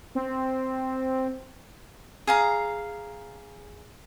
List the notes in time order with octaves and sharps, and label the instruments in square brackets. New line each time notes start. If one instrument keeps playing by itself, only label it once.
[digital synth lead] C4
[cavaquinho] G#4 F5 A#5